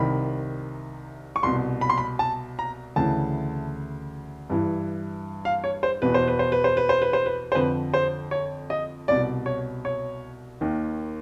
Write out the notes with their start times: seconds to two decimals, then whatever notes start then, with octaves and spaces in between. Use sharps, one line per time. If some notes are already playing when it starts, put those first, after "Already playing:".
Already playing: C2 C3 D#3 B5
1.36 C#6
1.43 C2 B2 C6
1.81 B5
1.90 C6
1.98 B5
2.19 A5
2.59 A#5
2.96 D2 C#3 E3 A5
4.50 G2 E3
5.45 F5
5.64 C#5
5.83 C5
6.02 E2 B2 B4
6.14 C5
6.28 B4
6.39 C5
6.52 B4
6.64 C5
6.77 B4
6.89 C5
7.02 B4
7.13 C5
7.26 B4
7.52 C5
7.55 F2 D3 B4
7.94 C5
8.31 C#5
8.70 D#5
9.08 C2 B2 D5
9.46 C#5
9.85 C#5
10.61 D#2 D#3